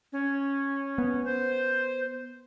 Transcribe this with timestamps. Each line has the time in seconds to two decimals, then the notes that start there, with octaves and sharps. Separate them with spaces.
0.12 C#4
0.98 B3
1.25 C5